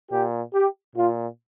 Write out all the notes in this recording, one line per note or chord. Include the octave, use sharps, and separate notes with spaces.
A#2 G4
G4
A#2 F4